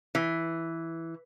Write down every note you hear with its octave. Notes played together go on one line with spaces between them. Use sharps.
E3